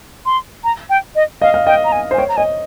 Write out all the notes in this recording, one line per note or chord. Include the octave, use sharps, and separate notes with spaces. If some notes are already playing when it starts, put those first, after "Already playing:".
C6
A#5
G5
D#5
D#5 F5
F5
D#5 G5
A#5
G#5
C5
G#5
C#5 G5
A#5
D#5 G#5